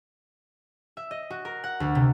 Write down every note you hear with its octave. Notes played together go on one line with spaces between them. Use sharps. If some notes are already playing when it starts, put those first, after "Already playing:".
E5
D#5
F#4
A#4
F#5
D2
C3